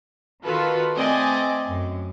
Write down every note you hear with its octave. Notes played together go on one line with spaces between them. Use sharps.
D#3 F4 F#4 A4 B4 B5
A3 C4 D5 D#5 G#5
F#2